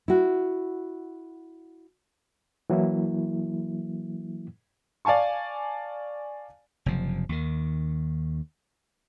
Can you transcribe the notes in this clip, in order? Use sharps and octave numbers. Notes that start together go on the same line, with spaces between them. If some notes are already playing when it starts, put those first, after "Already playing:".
E4 F#4
E3 F#3 A#3 E4
D5 F5 G#5 A5 C#6
F#1 C3 F3
D#2 D#3